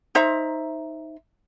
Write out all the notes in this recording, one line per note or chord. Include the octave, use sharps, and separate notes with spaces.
D#4 C5 E5 A#5